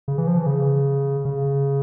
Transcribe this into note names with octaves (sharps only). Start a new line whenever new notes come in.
C#3
E3
F3
E3
C#3
C#3